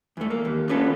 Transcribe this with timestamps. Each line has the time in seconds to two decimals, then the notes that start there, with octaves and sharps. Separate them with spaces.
0.17 E2 A3
0.30 A#3
0.45 D#2
0.69 A#3 B3 C#4 F4 A4 B4